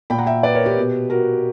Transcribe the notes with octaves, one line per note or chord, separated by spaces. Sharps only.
A#2 G5 B5
F#5 A#5
E5 G5
B4 D5
A#4 C#5
G4 B4
B2
F#4 A#4